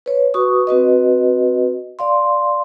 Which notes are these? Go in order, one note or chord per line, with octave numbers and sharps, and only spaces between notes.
B4 C#5
F#4 B4 C#6 D#6
C4 F#4 B4 D#5
D5 F5 C6